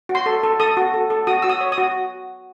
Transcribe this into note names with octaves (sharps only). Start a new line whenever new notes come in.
F#4
C6
A4
A4
A4 D#6
F#4
A4
A4
F#4 D#6
F#4 E6
D#6
C#5
D#6
F#4